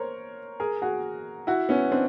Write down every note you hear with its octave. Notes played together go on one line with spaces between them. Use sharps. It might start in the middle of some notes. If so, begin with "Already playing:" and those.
Already playing: A#4 C5 C#5
G#4 A#4
F#4 G#4
E4 F#4
B3 C#4
C4 D4